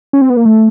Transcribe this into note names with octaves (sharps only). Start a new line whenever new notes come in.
C#4
C4
B3
A#3
A3